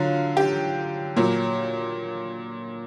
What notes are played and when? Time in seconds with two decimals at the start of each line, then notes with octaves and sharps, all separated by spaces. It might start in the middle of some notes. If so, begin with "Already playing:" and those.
Already playing: D3 F#3 F4
0.37 G4
1.16 A#2 F#3